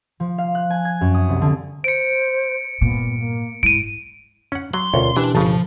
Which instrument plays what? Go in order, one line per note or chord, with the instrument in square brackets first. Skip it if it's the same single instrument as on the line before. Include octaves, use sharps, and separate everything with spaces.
[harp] F3
F5
F#6
G#5
G#6
F#2
D#6
C2
D3
[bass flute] C5 [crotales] C#7 D7
[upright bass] G2 A#2 [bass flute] B3
[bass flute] A#3
[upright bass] G#2 [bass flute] E4 [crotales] D7 D#7
[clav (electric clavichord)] C#4 F#5
[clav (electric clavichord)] F#3 [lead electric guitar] C6
[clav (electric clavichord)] D2 [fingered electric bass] B2 C#4 [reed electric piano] F4 A#4 C#5
[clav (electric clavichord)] E3 [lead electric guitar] D4 [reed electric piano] G4 B4
[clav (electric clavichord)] G1 C#3 [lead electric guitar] F3 [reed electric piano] A5